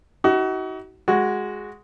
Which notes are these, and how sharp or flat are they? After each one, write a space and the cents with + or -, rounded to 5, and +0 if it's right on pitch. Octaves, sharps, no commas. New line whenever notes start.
D#4 +45 F#4 +30
G#3 +0 F#4 -5